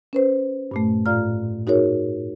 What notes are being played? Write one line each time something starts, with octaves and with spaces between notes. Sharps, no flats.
C#4 B4 C5
G2 A#2 A3
A2 F4 D5 F5 A#5 F6
D#4 F#4 G#4 A#4 C#5